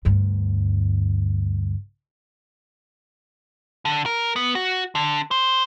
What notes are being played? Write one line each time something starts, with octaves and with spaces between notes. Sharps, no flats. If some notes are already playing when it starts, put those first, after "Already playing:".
D2 G2
D3
A#4
B3
F#4
D3
C5